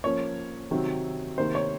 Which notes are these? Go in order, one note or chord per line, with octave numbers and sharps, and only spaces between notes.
F3 A#3 C#4 C#5
C3 D#3 F#3 C4
C3 D#3 A#3 C5
C#5